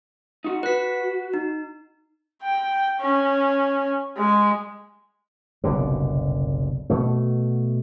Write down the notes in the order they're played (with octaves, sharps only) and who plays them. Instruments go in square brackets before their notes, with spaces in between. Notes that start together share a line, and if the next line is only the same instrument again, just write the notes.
[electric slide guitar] D#4 F#4
[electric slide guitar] F#4 [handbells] B4 B6
[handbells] D#4
[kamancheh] G5
C#4
G#3
[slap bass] F#1 C2 B2 D3
B2 A3